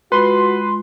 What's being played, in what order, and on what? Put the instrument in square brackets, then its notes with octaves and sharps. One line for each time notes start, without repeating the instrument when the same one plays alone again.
[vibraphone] G#3 F4 [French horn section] F#4 [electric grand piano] B4 [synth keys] C6